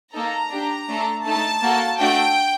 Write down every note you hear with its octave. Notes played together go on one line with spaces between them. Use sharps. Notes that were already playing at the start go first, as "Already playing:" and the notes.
A#3 D#4 A4 A#5
D4 G4
A3 D4 A4
A3 D#4 A4 A5
A#3 F#4 A4
A3 D4 F#4 A4 G5